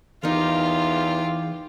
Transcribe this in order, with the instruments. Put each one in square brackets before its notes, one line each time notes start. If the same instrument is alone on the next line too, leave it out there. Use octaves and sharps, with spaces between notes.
[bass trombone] E2 [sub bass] E3 [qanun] D#4 A#4 [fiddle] F4 G4